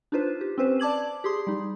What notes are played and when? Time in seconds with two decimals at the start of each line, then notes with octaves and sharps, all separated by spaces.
0.12 D4 D#4 F4 B4 C5
0.41 G4
0.58 C4 C#4 B4 C5
0.80 D5 A5 D6 G#6 F#7
1.24 G4 G#4 C6 D#6
1.47 G3 D#4